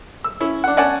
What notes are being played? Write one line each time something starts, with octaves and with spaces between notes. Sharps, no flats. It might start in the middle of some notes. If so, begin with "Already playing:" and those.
E6
C#4 E4
D4 F#5
C#4 D5 F#5 G#5 A5